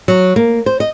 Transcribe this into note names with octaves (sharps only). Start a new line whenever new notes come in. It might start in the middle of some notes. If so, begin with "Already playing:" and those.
F#3
A#3
C5
D#5